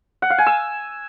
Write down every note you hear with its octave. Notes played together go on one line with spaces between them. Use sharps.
F#5
F5
G#5
E6